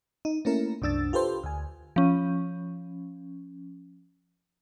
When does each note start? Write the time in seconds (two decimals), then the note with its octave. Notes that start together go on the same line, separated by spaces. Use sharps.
0.25 D#4
0.45 A3 A#3 C#4 E4 A#4
0.82 C2 F#2 D4 E6 A6
1.13 F4 G4 A4 B4 C5
1.44 D2 G#5
1.96 F3 C#4